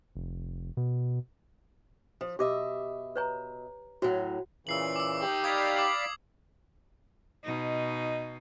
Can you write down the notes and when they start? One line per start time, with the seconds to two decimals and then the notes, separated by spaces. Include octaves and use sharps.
0.15 F1
0.77 B2
2.21 F3
2.39 B2 G4 D#5 E5 D6
3.16 B4 C#5 A#5
4.02 A2 F#3 F#4 F#5
4.67 A#2 C#3 E3 E6 C7 F#7
4.96 D6 E6
5.22 D#4 G4
5.44 D5 F5 B5 D#6 G#6
5.76 D6 F#7
7.44 B2 D#4